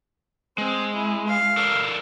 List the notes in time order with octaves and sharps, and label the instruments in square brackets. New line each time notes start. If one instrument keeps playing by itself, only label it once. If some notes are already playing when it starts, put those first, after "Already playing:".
[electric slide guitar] G#3 [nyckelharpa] C4
[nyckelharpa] E4
F5
[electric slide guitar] D4 A4 A#4